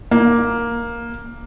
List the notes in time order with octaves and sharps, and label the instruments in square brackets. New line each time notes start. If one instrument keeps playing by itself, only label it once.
[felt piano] A#3